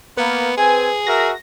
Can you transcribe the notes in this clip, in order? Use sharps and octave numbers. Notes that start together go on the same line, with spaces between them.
A#3 B3 B4
C4 G#4 G#5
F#4 A#4 E5 A#6